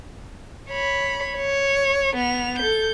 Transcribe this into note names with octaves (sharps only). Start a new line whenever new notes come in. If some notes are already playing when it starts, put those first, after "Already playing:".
C#5 B5
C#5
B3 F7
A4 G6